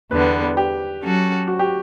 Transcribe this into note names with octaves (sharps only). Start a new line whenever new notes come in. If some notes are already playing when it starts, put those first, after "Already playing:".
E2 D3 G3 B3 B4
G4
F#3 C#4 F#4 A4
F#4
G4